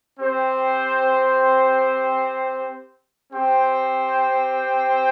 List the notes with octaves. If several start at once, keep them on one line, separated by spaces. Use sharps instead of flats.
C4 G4 C5
C4 G4 C5 G5